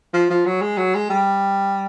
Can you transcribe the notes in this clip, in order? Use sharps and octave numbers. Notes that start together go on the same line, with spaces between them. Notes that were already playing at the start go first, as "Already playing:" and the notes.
F3
F3
F#3
G#3
F#3
G#3
G3